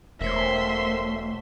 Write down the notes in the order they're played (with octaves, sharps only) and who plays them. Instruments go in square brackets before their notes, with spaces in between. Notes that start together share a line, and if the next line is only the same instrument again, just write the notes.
[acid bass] E1 [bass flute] A3 [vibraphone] A#4 C5 C#5 [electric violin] E5 C6